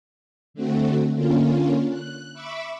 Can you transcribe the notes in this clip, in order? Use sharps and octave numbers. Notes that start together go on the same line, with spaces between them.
D3 A3 C4 F#4
D3 A#3 C#4 F4
F#6
E5 B5 C#6 D6 E6